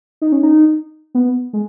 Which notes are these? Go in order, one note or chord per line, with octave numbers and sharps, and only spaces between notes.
D#4
C#4
D#4
B3
G#3